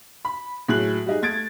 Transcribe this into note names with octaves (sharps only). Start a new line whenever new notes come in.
B5
A2 F#3 G#4 F#6 F#7
G3 D#4 G#4
A3 G#6 A6 D7